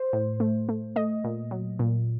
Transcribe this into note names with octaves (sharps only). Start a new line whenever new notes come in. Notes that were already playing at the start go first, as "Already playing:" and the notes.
Already playing: C5
A2
A3
A3
A3 D#5
A#2
F#3
A#2